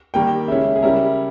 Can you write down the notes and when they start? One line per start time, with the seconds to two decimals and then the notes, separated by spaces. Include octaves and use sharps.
0.14 D#3 G3 A#3 G5
0.48 C#3 G#3 C#4 E4 E5
0.76 G#4
0.82 C#3 G3 C#4 E4 A#4